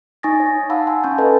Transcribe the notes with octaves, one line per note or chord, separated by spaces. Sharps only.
D#4 G#5 C#6 D#6 A6 A#6
C#5
F5 F#5 A5 B5 E6
G#5 B5 C6
C#4 A5 C#6 G6
A4 B4 D#5 G#5 A5